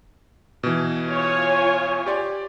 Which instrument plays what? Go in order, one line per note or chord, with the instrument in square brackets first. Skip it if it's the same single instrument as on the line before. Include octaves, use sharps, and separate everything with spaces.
[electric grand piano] B2 E3
[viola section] F4 C#5 G#5
[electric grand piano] G4 D5 C6